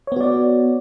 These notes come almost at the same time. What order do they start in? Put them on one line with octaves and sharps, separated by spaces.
C#5 B3 F#4 D5